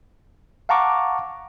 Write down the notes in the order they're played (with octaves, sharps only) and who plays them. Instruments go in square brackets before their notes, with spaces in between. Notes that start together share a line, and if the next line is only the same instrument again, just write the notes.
[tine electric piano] F5 F#5 A5 A#5 C#6 D6